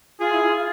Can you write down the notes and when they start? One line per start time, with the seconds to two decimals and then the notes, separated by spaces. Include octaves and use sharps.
0.19 F4 G#4
0.33 E4
0.44 F4
0.57 F4